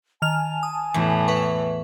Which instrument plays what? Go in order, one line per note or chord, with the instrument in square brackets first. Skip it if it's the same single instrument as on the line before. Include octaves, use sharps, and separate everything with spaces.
[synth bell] D#3 F6 F7 [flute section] G#5 A5
[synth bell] D#6
[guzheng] E2 [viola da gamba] A2 E3
[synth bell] B4 E5 C#6